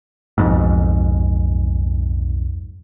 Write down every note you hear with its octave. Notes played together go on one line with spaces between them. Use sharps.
B1 F2 G#2